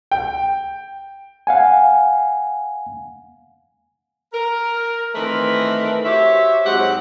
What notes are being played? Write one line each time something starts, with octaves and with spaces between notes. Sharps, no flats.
G5
F5 F#5 G#5
A#4
D#3 E3 A3 C4 A#4 B4
F#4 G4 C5 C#5 E5
G#2 F#3 G#3 C4 G4 F#5